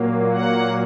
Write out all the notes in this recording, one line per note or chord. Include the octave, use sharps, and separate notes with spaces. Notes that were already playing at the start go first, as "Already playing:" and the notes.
Already playing: A#2 F#3 A#3
F#5